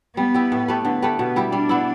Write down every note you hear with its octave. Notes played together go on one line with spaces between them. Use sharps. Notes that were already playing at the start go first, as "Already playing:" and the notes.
G3 B3
E4 G4
A2
A3 G4 B4
D3 B3
A3 G4 B4
B2 B3
G3 E4 G4
G3 D4
B3 E4